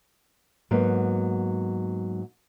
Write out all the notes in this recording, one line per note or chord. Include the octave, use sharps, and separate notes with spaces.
G#2 F#3 A#3 B3